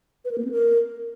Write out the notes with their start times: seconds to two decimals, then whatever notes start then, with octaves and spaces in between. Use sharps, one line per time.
0.25 B4
0.31 A#4
0.38 A#3
0.45 C4
0.51 A#4